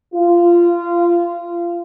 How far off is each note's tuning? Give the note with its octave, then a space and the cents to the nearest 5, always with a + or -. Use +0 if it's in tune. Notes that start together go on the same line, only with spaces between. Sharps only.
F4 -20